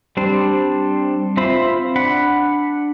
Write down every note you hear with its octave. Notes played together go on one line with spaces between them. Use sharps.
G3 C4 D4 C5
C4 F4 C5 E5 B5
D4 F#5 B5